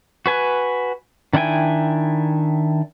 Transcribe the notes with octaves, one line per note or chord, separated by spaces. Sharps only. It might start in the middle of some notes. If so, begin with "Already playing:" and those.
F#4 B4 G#5
D#3 D4 E4 G5 G#5